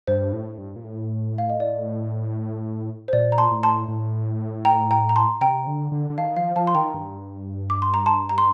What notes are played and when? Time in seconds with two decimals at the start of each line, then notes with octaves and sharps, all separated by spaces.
0.07 G2 C5
0.33 A2
0.58 G2
0.76 A#2
0.84 A2
1.38 F5
1.50 D#5
1.60 D5
3.08 C5
3.13 A#2 D5
3.32 A#5
3.38 A5 C6
3.51 A2
3.63 A5 C6
3.88 A2
4.65 G5 A#5
4.91 G5 A#5
5.09 A#5
5.16 A5 C6
5.41 C3 G5 A#5
5.67 D3
5.92 D3
6.10 D3
6.18 D#3 F5 A5
6.36 F3 F5
6.56 F3 F5 A5
6.67 C6
6.75 D#3 G5 A#5
6.94 G2
7.70 D6
7.82 C6
7.94 A#5
8.06 A5 C6
8.29 A#5
8.38 C6